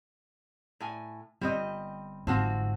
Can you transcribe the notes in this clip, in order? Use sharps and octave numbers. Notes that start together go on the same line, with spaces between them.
A2 G#5
G1 G3 C4 D#5
G1 G#2 F3 C4 F#4